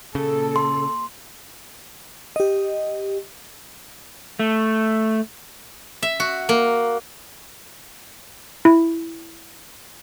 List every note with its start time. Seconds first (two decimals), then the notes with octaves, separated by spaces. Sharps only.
0.15 A#2 C#3 A4
0.56 C6
2.36 G4 D#5
4.39 A3
6.02 E5
6.20 F#4
6.49 A#3
8.65 E4